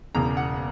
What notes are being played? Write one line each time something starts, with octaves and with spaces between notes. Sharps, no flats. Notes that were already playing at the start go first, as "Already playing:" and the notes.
E1 E2 C#3 A#5
F#5